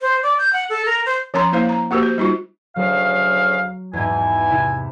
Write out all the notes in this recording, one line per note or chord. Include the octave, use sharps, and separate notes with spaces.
C5
D5
G6
F#5
A4
A#4
C5
F3 C#4 A#4 C#5 A#5 C6
A#3 E4 C5 F5
A#5
A#3 F#4 G4 A#4 C5
C5
G3 D#4 F4 F#4
D2 C#3 F#3 F5
E2 G#2 B2 E3 G#5
C3 E4 E7